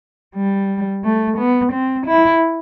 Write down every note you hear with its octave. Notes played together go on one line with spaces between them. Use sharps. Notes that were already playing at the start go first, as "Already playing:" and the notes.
G3
A3
B3
C4
E4